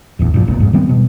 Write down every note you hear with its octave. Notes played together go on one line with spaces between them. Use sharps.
D1 A#1 E2
G2 A#2 F3
F#1 B1 A#2
F2 G#2
D#3 G3 B3 C4
B2